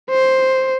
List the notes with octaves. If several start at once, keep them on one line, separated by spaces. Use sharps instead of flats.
C5